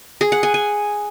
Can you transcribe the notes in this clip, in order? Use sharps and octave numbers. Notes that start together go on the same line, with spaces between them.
G#4
F#5
G#5
G#5